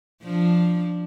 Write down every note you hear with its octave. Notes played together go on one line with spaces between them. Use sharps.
F3 D4